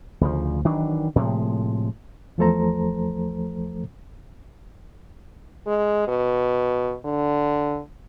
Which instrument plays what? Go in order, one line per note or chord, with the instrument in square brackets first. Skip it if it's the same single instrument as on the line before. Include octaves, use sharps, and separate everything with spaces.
[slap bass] D2 C#3 F3
D#3 E3 F#3 D4
A2 C3 F3 G#3
[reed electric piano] E2 F3 A3 A4 C5 A#5
[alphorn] G#3
B2
D3